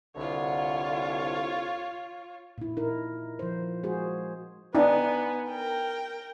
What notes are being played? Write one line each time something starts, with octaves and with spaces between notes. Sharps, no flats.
C2 D3 F4 C#5
A#2 E4
D#4 E4 A#4
F3 C5
G#3 F#4 G#4 C5
B3 D4 D#4 G#5
A#4 G5